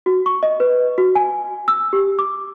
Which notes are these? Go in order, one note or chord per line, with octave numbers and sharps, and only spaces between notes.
F#4
C#6
D#5
B4
F#4
G#5
E6
G4
D6